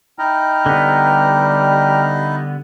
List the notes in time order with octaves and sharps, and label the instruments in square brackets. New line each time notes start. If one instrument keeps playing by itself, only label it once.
[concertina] D#4 E4 D#5 [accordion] G5 A#5 F6
[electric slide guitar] D3 B3 [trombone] G3